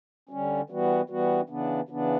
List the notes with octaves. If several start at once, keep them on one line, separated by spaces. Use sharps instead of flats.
D3 G3 C#4
E3 G3 B3 F#4
E3 G3 B3 F#4
C#3 E3 B3 D4
C#3 E3 B3 D4